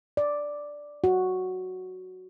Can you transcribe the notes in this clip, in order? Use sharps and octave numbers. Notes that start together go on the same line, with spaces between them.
D5
F#4